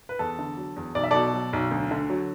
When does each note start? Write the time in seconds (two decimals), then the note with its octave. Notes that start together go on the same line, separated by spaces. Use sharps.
0.09 B4
0.19 E2 A4
0.39 D3
0.57 F#3
0.76 E2
0.95 B1 D5
1.04 E5
1.11 B2 A4 D5
1.34 F#3
1.53 B1
1.71 D2
1.91 D3
2.10 F#3